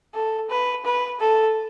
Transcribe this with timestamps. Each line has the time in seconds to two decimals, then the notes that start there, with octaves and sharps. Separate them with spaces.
0.14 A4
0.50 B4
0.85 B4
1.20 A4